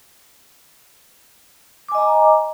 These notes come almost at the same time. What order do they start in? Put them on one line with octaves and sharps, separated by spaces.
D6 G#5 D#5 A#5